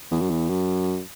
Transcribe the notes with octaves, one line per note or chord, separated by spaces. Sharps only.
E2
F#2
E2
F#2